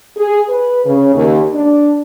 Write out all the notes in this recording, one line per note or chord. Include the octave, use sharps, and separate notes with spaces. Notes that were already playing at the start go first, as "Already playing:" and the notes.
G#4
B4
C#3
D#2
D4